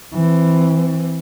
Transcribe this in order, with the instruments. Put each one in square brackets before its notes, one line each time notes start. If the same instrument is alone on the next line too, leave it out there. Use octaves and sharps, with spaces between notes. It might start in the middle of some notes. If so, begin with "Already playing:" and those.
[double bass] E3 C4